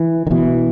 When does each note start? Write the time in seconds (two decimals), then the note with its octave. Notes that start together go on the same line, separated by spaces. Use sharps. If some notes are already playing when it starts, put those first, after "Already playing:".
Already playing: E3
0.27 D#3
0.31 B2 E3